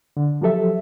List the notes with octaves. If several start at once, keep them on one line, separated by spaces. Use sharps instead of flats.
D3
F3 F#3 G4 A4 E5